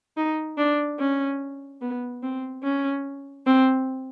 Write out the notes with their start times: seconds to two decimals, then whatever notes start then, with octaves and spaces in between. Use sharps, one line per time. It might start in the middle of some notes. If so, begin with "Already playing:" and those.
0.17 D#4
0.57 D4
0.99 C#4
1.81 B3
2.23 C4
2.63 C#4
3.46 C4